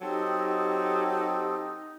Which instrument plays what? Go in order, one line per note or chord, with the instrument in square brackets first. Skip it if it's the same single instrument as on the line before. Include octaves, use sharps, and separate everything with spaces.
[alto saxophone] F#3 [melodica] C4 A4 [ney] D#4 [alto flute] G4